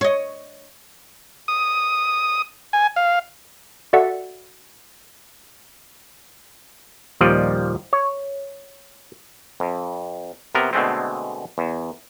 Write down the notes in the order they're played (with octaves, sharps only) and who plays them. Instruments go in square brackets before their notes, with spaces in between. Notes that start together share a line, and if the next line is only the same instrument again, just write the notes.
[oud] C#5 D#5
[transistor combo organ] D#6
G#5
F5
[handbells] F#4 A4 D5 E5 F#5
[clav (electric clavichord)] D#2 A#2 F3 G3 D5 D#5
C#5
F2
C3 B3 A#4
B2 D3 G#3 A3 C4
E2